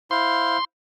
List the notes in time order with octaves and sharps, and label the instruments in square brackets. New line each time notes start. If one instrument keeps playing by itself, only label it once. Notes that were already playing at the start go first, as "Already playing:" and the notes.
[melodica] E4 C5 F5 [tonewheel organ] C6